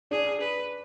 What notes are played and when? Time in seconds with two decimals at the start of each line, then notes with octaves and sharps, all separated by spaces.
0.11 D4 G#4
0.41 B4